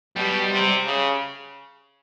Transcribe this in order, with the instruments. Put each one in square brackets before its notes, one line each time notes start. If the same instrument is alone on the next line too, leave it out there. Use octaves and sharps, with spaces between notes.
[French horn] B2 [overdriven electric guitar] G3
[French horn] C3
C#3